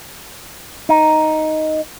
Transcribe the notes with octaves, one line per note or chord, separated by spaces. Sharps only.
D#4